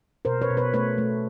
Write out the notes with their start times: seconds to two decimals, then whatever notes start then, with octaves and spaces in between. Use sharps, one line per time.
0.25 B2 A#4 C5
0.42 B4 C#5
0.50 B2
0.57 B4 C#5
0.73 A3 B4 C#5
0.98 A3